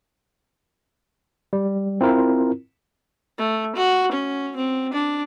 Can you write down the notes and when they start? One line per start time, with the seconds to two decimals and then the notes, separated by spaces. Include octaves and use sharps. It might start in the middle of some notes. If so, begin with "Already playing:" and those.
1.53 G3
2.01 C4 E4 F4 A#4
3.38 A3
3.76 F#4
4.12 C#4
4.56 C4
4.93 D4